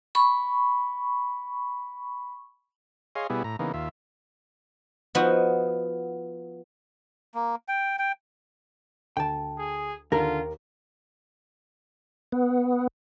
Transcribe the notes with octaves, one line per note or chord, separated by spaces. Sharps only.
B5 C#6
G#4 C#5 D#5 F5 C6
B2 G3 B3 E4 G#4
A2 A#5
C#3 E3 A#3 B3 D#4
D#2 F4 E5
F3 B3 D#4 F4 F#4
A#3
G5
G5
D2 G5 A5
G#4
D#2 D3 F4 A#4
B3